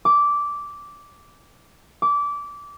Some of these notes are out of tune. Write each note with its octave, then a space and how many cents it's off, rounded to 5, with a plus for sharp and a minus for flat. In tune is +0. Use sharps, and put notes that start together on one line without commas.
D6 -10
D6 -20